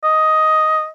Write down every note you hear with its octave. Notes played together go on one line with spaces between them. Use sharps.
D#5